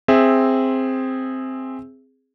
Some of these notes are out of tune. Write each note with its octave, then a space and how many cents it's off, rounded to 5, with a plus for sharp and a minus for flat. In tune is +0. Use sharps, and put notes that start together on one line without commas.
C4 +0 G#4 -5 E5 +0